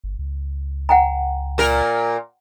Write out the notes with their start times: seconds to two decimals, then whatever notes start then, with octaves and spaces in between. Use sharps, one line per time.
0.04 G1
0.19 C#2
0.89 F#5 G5 A#5
1.58 A#2 A#4